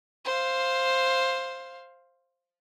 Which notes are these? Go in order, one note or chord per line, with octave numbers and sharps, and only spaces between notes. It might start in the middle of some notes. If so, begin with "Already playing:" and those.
C5 F5